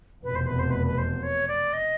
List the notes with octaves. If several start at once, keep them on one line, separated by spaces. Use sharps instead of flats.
F1 E2 B2 B4
C5
B4
C5
B4
B4
C5
C#5
D5
D#5